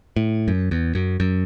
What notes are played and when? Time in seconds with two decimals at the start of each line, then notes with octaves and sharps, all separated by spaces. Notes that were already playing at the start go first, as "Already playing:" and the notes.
0.16 A2
0.48 F#2
0.71 E2
0.95 F#2
1.20 F#2